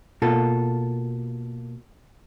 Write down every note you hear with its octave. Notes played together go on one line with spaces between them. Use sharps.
B2 A#3 F4 A4